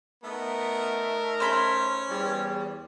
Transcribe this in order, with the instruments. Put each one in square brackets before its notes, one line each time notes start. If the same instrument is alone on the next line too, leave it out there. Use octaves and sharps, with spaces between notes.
[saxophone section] A3 D#4 E5 [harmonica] B3 [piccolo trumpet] A#4
[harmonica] C#4 [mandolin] C5 B5
[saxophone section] E2 G3